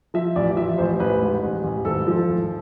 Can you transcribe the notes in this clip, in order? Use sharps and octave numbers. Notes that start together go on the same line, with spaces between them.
F3 E5
A1 D5
F3 E5
A1 C5
A1 B4
G#2
A1
A1
G#1 A4
F3
G#1